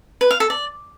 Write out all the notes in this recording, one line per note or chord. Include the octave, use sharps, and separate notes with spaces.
B4
F5
A4
D5